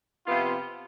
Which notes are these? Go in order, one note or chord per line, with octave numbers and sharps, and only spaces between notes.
C3 F3 B3 F4